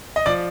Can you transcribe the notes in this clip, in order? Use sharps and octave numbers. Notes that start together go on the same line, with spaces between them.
D#5
F3 D5